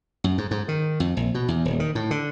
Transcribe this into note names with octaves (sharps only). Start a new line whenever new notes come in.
F#2
G#2
G#2
D#3
F2
A#1
B2
E2
D#1
D#3
A2
D3